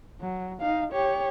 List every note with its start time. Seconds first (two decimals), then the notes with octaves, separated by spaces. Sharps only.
0.21 F#3
0.60 D#4 F5
0.93 G4 C#5